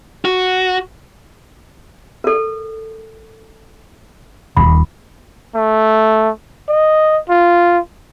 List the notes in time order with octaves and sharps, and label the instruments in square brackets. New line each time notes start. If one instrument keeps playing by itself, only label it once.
[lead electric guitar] F#4
[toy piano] A4 A#4
[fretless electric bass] D#1 [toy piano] B5
[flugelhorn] A3
D#5
F4